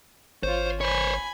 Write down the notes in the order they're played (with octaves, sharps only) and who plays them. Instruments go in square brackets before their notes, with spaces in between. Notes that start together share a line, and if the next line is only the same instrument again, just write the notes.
[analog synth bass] G#1 [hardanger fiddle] F4 C#5 [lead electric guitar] C5
[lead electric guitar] C5 C#5 [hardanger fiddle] G#5 B5